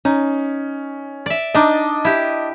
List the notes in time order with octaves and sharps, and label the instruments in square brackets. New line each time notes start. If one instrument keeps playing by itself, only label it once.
[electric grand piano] C#4 [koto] D#4
[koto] D5 E5
[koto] D4 D#4 [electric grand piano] D#5 A5 D6
[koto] E4 G4